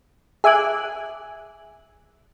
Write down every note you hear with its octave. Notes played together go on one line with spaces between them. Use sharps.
G#4 E5 G#5 D6 F#6